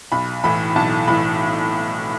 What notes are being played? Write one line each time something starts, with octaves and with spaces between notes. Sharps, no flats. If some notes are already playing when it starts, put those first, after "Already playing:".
B1 B5
A2 E3 B5
B1 A5
A2 E3 B5